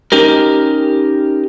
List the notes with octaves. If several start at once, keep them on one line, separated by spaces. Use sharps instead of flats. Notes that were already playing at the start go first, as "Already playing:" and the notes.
C#4 D#4 G4 A#4